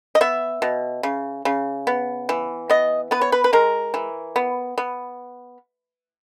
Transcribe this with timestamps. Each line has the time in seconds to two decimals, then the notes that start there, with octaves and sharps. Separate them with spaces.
0.15 D#5
0.21 B3 E5
0.62 B2
1.03 C#3
1.45 C#3
1.87 B3
2.29 E3
2.70 B3 D#5
3.11 B3 B4
3.21 C#5
3.32 B4
3.44 B4
3.53 G#3 A#4
3.94 E3
4.36 B3
4.78 B3